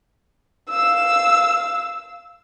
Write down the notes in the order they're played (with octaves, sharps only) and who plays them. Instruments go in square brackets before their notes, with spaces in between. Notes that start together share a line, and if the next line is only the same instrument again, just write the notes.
[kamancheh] F5 E6